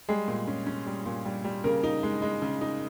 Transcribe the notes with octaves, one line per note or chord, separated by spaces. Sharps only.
G3 G#3 G#4
A#2
C#4
C#4
G3
A#2
G3
G3
C#3 A#3 A#4
D#4
G#3
G#3
C#3
D#4